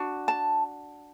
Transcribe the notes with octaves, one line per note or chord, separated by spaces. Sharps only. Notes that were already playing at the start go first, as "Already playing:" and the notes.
Already playing: D4 F#4
A5